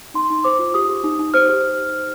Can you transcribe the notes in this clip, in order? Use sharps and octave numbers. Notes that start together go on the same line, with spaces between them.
D#4 C6
D#4
C5 D6
F4
G4 D#6
G4
D#4
D#4
C5 F6
G4